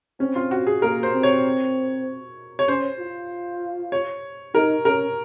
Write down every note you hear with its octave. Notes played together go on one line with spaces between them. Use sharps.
C4 C#4
F4
F#4
G#4
A#3 A#4
C5
C4
C#5
C#5
C#4 C5
F4
C#5
D#4 A#4
C#4 A#4